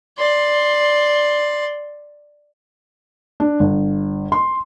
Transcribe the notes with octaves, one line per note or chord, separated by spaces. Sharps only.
D5 C6
D4
G1
C6